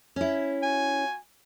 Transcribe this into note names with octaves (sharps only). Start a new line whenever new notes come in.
C#4 E4
F#4 G#5